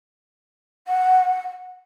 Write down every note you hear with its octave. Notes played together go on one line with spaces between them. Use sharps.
F#5